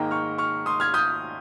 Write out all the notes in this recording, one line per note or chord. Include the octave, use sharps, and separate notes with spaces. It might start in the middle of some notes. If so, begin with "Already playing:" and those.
Already playing: G#2 D#3 A#3 D#4 G5 A#5
C#6 F6
C#6 F6
C6 D#6
F6 G#6
D#6 G6